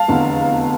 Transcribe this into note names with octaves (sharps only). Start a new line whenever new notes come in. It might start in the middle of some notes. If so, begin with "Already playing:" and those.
Already playing: F5 A5
F1 E2 D3